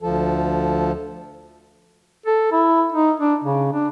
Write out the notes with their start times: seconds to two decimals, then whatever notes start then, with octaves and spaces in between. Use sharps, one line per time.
0.02 D2 F3 A4
2.26 A4
2.52 E4
2.92 D#4
3.20 D4
3.44 C#3
3.73 D4